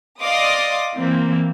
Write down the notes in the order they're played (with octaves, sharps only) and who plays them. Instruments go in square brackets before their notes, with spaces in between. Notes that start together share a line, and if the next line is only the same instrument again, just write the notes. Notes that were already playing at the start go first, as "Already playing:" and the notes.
[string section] D5 D#5 F5 C6 D6 D#6
E3 A#3 C4